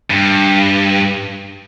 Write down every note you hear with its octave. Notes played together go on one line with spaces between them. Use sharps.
G2